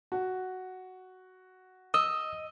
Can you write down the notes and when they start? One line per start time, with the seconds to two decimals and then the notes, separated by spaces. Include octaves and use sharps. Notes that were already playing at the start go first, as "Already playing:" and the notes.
0.12 F#4
1.94 D#5 D#6 E6